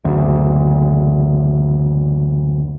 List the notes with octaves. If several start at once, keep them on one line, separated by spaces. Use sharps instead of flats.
F#1 D2